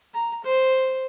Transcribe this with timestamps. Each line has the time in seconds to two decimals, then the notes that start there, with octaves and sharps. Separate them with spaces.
0.14 A#5
0.44 C5